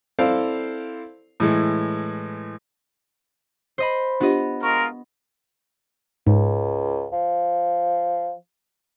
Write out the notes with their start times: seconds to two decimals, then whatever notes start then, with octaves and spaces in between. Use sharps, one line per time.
0.19 C4 E4 A4 C5 D5 F5
1.40 A2 E3 G#3
3.78 C5 D#5 B5
4.20 B3 D4 F4 G4 D#5
4.63 G#3 F4 A#4 C#6
6.27 C#2 G#2
7.12 F3